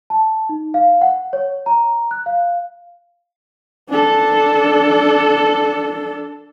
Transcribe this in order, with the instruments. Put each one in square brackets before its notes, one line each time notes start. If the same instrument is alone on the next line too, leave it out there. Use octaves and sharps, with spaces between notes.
[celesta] A5
D#4
F5
F#5
C#5
A#5
F#6
F5
[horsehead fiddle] D4 A4